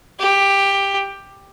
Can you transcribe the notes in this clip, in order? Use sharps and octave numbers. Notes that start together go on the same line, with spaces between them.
G4